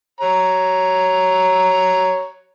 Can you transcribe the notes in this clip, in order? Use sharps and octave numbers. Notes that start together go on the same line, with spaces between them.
C#5 A#5